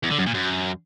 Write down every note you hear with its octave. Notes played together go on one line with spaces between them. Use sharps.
E2
D3
F#2
A#2
F#2